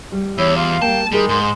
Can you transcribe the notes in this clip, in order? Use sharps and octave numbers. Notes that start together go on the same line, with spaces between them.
G3
E2 E4 C#5
F4 F5
G3 A#3 G5 A5
D3 D#3 G3 G#3 G#4 A#4
G#2 C6